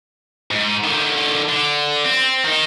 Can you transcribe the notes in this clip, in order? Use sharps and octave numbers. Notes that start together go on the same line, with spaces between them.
G#2
D3 D#3
D3
C4
D#3 D#4